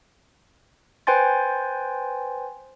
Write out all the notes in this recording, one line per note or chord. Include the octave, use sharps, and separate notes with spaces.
B4 C5 G5 G#5 C6 A6